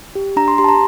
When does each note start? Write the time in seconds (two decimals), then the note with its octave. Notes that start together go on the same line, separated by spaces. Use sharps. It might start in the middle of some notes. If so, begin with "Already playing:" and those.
0.15 G4
0.36 D4 A#5
0.48 C6
0.58 G4 C6
0.64 A5
0.69 A#5